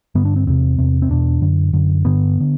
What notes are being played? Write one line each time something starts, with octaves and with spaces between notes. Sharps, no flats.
G2 D3 B3
D4
C4
E2 C3 C4
E2 C3
C4
E2 B2 D4
F#2 D3
F#2 D3
G2 D3 B3
D3